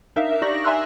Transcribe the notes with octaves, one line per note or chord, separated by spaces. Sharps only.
D4 D#4 A#4 E5 F5
D#4 G4 D5 C#6 A#6 F#7
E5 G#5 A#5 C6 E6 F#6